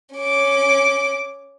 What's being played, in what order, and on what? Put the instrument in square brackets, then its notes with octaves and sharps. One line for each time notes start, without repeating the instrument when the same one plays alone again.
[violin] C#4 D6